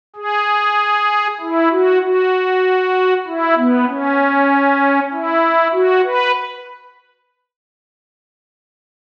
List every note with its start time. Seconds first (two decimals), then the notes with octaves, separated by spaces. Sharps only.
0.16 G#4
1.40 E4
1.71 F#4
2.02 F#4
3.26 E4
3.57 B3
3.88 C#4
5.12 E4
5.73 F#4
6.04 B4